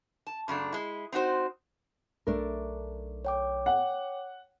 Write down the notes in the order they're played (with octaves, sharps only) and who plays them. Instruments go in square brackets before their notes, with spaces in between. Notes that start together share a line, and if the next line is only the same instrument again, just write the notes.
[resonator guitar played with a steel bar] A5
F#2 C#3 A3 D4
G#3 E4
C4 D#4 F#4 C5
[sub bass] B1 [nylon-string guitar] A3 D4 A#4
[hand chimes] C#5 G5 D6
[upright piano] F#5